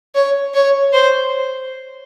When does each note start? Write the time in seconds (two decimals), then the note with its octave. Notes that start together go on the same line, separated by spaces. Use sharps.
0.15 C#5
0.54 C#5
0.93 C5